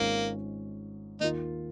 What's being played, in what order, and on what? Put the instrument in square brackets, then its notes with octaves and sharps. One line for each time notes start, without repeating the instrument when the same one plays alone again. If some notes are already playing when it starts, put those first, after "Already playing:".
Already playing: [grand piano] G#1 G#2 G#3 C#4 F4 [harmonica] A#3
[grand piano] D#2 D#3 A#3 F4 [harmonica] D#4